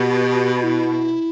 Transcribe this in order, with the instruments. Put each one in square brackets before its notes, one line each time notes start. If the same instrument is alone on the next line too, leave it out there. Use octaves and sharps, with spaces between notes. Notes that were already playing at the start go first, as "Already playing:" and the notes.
Already playing: [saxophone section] B2 [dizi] G4
[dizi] G4
E4